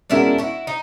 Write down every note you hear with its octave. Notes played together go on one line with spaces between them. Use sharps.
B2 G#3 C#4 D4 E4 F#4 A#4
E4 F#4
D#4